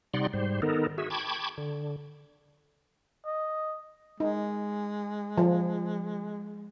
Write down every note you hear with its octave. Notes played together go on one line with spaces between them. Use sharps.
C3 G3 D#4 D5 F#5 C6
G#2 G3 C5
D#3 B3 D#4 A4 A#4
F#4 G#4 E5
G5 A5 B5 C#6 D6 G#6
D3
D#5
G#3 D#4
F3